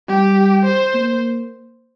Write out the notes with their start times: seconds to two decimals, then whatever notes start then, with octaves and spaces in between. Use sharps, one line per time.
0.08 G3 G4
0.65 C5
0.94 A#3